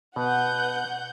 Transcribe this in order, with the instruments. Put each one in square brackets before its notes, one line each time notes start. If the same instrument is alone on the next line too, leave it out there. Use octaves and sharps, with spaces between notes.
[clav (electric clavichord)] B2 [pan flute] B4 [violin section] F#5 G6